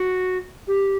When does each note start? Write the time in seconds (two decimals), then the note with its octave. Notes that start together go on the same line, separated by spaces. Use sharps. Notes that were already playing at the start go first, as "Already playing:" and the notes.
Already playing: F#4
0.68 G4